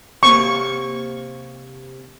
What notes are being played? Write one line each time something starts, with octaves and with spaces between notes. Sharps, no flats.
C3 A#3 C#6